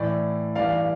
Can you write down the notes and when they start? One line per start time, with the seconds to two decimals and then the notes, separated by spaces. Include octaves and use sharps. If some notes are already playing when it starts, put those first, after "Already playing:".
Already playing: A2 E3 D5
0.55 G2 E3 D5 F5